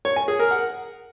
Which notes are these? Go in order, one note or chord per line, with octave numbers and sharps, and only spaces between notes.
C#5
G#5
G#4
A#4
F#5